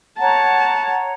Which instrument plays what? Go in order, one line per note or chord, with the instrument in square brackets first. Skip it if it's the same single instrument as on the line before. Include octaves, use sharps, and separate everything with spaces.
[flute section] C#5 F#5 A#5 [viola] A5